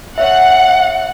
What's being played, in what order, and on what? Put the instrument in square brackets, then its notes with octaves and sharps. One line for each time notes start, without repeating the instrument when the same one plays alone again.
[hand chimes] C#5 E5 [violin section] F#5